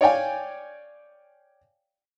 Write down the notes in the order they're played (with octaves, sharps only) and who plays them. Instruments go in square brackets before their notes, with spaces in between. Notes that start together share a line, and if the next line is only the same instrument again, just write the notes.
[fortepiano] C#5 D5 F5 G5 G#5